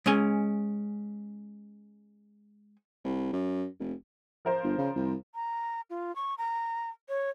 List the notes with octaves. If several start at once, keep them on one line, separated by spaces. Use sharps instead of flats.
G#3 C#4 G#5
C2
F#2
F1
F3 A#4 C5
G1
C#3
C2
A#5
F4
C#6
A#5
C#5